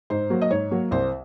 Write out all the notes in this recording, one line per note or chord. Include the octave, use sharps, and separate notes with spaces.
G#2 C5
F#3 A#3
D#5
G#2 C#5
F#3 A#3
C2 C5